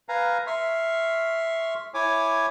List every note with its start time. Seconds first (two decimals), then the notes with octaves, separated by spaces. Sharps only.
0.09 B4 F5 G#5 A#5
0.47 E5 C6 C#6 F6
1.94 E4 C#5 G#5 D6